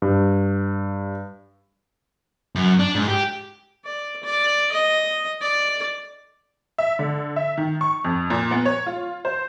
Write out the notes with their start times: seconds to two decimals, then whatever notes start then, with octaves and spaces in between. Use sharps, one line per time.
0.02 G2
2.55 F#2
2.79 D4
2.95 G#2
3.08 G4
3.84 D5
4.23 D5
4.72 D#5
5.41 D5
6.78 E5
6.99 D3
7.36 E5
7.57 D#3
7.81 C#6
8.04 F2
8.30 A#2
8.51 B3
8.66 C#5
8.86 F4
9.25 C5